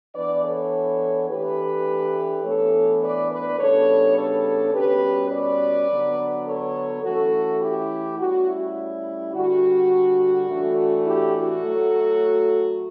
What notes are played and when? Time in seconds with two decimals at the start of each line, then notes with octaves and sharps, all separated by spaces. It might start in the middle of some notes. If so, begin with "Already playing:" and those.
0.14 E3 B3 D4 B4 D5
0.43 A4 C#5
1.29 E3 A3 D4 G4 B4
2.44 A2 E3 B3 D4 A4 C#5
3.01 B4 D5
3.30 B4 D5
3.59 C#3 G3 B3 D4 A4 C#5
4.16 A4 C#5
4.73 B2 G3 C#4 G4 B4
5.31 B4 D5
5.89 D3 F#3 B3
6.46 A4 C#5
7.03 E3 A3 C#4 F#4 A4
7.61 E4 G4
8.18 A2 G3 C#4 F#4
8.46 E4
9.33 D3 G3 D4 F#4
10.47 A2 E3 A3 D4
11.05 E4 G4
11.33 F#4 A4
11.62 A2 F#3 A3